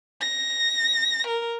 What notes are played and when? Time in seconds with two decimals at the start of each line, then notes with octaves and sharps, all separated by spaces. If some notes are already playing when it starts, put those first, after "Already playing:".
0.21 A#6
1.27 A#4